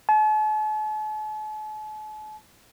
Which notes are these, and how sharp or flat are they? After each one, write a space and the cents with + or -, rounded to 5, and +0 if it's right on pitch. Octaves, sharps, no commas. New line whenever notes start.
A5 -45